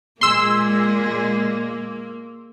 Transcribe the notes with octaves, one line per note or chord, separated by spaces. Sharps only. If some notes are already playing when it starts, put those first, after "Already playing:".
A#2 G#3 A#3 G#4 C6 E6